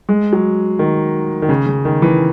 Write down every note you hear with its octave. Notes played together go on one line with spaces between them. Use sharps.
G#3
F#3
D#3
D#3
C#3
C#3
D#3
E3